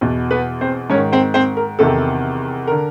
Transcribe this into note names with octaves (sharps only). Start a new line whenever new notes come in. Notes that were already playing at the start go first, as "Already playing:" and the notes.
E2 B2
B3 B4
C4 C5
G#2 C#4 C#5
D#3
C4 C5
C4 C5
A#4
E2 C3 D#3 A4
D3 A#4